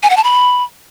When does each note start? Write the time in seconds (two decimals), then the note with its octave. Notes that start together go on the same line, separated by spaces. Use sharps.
0.03 G#5
0.10 F#5
0.17 A5
0.24 B5